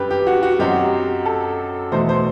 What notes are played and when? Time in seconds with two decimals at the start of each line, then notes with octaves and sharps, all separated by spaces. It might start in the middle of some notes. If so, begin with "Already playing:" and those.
Already playing: F#2 D#3 G3 G4 B4
0.11 G4
0.27 F#4
0.43 F#4
0.59 F#2 F#3 C4 D#4 G4
1.25 A4
1.92 E2 B2 A3 D#4 C5
2.09 C5